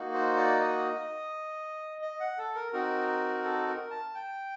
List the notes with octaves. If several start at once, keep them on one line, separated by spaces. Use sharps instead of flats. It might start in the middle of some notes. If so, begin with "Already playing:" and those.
Already playing: A#3 D#4 F#4
C5
D5
D#5
D#5
F#5
A4
A#4
C4 D#4 F#4 A#4
A4
A#4
A5
G5